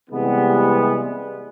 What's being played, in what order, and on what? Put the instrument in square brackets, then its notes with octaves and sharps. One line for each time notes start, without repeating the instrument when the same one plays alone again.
[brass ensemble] C3 E3 G3 G#3 B3